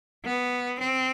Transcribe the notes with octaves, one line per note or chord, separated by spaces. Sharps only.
B3
C4